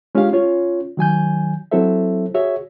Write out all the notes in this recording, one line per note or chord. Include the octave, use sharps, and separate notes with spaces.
G#3 C#4 D4 F4 G4 F5
C#4 F4 C#5
D#3 F#3 G#5 G6
F#3 C4 E4 A4 C5 E5
F#4 G#4 C#5 E5